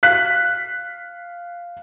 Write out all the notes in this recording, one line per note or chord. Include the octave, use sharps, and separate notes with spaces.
F5 F#6 B6